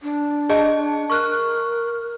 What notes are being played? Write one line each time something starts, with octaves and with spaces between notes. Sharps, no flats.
D4
G#4 D#5 A5
A#4 C#6 F6 F#6